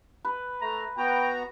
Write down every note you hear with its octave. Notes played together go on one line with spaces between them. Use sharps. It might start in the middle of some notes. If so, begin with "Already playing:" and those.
B4
A3 A#5
B3 F#4 G5 A#5